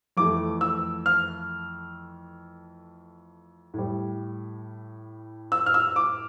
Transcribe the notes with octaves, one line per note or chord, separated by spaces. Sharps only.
F2 E3 A3 D6
E6
F6
A2 G3
E6
F6
E6
D6